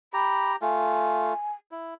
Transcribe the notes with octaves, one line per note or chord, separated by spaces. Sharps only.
G4 A#5 B5
A3 F4 G#5
E4